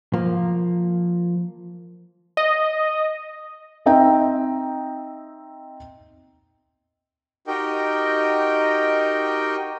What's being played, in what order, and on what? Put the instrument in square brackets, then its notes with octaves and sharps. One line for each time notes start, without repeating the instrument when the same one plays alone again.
[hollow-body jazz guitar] F3 A#3
[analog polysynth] D#5
[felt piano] C4 D#4 D#5 E5 G5 A#5
[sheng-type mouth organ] D#4 F#4 G4 A#4 D#5 G5